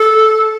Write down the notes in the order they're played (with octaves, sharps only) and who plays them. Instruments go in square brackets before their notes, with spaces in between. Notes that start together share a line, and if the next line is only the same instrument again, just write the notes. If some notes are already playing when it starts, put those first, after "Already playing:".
Already playing: [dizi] A4